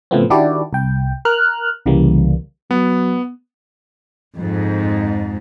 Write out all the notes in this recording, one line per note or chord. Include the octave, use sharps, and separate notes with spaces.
A2 C#3 F3 A3 B3 C4
D#3 D4 E4 F#4 G4 D5
C2 G5
A#4 F6 F#6
C2 C#3 E3 G3 A#3
F#3 B3
F2 G#2